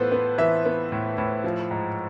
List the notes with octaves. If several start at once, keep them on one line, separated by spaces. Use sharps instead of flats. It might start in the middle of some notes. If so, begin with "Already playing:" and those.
Already playing: A2 E3 B3 F4 A4 B4 C5
B3
E3 E5
B3
A2
A2
F3
G#2